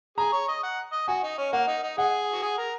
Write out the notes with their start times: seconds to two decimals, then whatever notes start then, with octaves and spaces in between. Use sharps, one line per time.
0.18 G#4 A#5
0.32 C#5
0.48 D#5
0.63 F#5
0.93 D#5
1.08 F#4 G#5
1.23 D#4
1.38 C#4
1.53 A#3 F#5
1.67 D#4
1.83 D#4
1.98 G#4 F#5
2.33 F#4
2.42 G#4
2.58 A#4